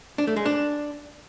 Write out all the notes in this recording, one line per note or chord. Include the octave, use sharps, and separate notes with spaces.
D4
A3
G#3
D4